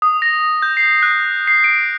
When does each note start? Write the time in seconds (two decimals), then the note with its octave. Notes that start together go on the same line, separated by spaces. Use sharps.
0.02 D#6
0.22 A#6
0.62 G6
0.77 C7
1.03 F#6
1.47 C7
1.64 D7